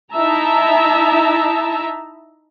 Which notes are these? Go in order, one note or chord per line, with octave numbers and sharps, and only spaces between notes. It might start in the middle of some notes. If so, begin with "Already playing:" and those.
D#4 E4 E5 A5 A#5